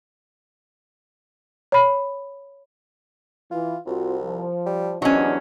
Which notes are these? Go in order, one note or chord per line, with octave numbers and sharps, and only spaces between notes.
C#5 B5
E3 F4
C2 C4 F4 F#4
F3
G3
E2 C3 F#3 C#4 D4 D#5